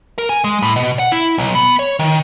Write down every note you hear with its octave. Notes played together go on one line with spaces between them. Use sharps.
A#4
G#5
G#3
A2
B2
F#5
E4
B1
B3
C#5
D#3